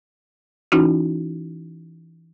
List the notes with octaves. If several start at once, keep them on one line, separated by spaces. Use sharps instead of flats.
E3 C#4 D#4 E4 F#4